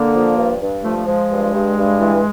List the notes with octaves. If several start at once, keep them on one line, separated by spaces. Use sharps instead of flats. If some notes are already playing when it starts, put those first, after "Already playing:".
Already playing: D3 A#3
F3
G2
G2
F3 A3
A3
F3 G#3
G2
G2
G2
E3